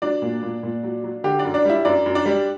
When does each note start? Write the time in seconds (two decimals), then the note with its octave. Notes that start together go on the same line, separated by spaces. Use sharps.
0.02 F#3 D4 D5
0.22 A#2
0.43 A#2
0.63 A#2
0.83 F#3
1.04 F#3
1.24 D3 G4
1.39 D4 D5
1.45 F#2
1.54 D4 D5
1.65 G3 E4 E5
1.85 F#2 D4 D5
2.06 F#2
2.15 D4 D5
2.26 G3